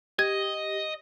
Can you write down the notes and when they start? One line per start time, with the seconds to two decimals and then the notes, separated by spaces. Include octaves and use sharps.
0.19 G4 D#5 G#6